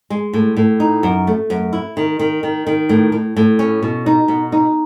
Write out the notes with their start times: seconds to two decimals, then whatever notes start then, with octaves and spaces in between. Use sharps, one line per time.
0.10 G#3
0.33 A2
0.56 A2
0.80 D#4
1.03 F#2
1.27 A3
1.50 F#2
1.73 E4
1.97 D#3
2.19 D#3
2.43 D#3
2.67 D#3
2.89 A2
3.12 A2
3.37 A2
3.59 C#4
3.83 B2
4.06 D#4
4.28 B2
4.52 D#4